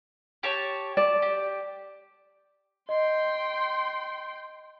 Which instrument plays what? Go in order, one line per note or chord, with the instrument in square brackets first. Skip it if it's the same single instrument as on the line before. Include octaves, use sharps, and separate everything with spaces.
[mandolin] G4 C#5 A5
[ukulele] D5 [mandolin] A5
[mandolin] G4
[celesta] D#5 [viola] G5 C6